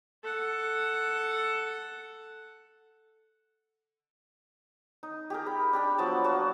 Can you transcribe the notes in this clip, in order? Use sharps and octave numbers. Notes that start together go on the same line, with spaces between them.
A4 F#5
D#4
G4 G#4 A#4
B5
D4 G4 B5
F3 F#3 B3 A5
F#3 A#3 A5